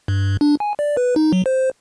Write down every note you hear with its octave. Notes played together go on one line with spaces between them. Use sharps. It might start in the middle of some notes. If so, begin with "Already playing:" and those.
G2
D4
G#5
D5
B4
D#4
F#3
C5